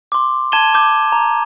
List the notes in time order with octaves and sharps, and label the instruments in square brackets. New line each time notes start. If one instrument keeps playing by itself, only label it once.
[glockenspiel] C6 D6
A5 G#6 D#7 E7 G7
D6 G6
A#5